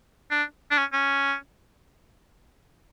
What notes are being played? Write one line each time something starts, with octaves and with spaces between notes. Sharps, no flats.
D4
D4
C#4
C#4